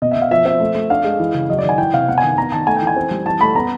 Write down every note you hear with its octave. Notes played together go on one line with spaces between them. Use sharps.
B2 D#5
E5
B2
F5
F3 E5
C4 E5
A3
A3
D4 F5
G#3
E3
C#3
F#3 D#5
D5
D#3
G#5
E3 G5
C3 F5
B3 F#5
G#5
D#3
B3 A#5
D#3 A5
A3 G#5
G5
E3
G#5
C4
G3
E3 A5
A3 B5
B3 A#5